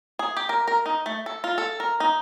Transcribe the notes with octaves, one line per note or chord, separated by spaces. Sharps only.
G#4
G4
A#4
A#4
D#4
A3
A4
F4
A4
A#4
D#4